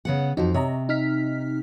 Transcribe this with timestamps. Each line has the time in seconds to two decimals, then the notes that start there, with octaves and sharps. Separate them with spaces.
0.05 C#3 B3 F#5
0.37 F2 F3 D#4 F#4
0.54 C3 C#5 D#5 A#5
0.89 D#4 F6 B6